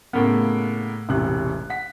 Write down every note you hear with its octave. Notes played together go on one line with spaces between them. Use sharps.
A2 C#3 A#3 B3
E1 A1 C3 F#6
F#5 B6